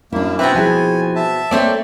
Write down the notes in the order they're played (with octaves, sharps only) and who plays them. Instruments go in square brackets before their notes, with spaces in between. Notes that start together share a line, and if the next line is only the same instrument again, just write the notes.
[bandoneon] F#2 A#3 [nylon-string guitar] D4 E4
[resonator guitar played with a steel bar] B2 B3 C4 [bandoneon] B4 E5
[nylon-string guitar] F3 E4 G#4 [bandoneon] G#5
[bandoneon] E5 A5
[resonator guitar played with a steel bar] A3 C4 D5 [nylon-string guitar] A#3 C#5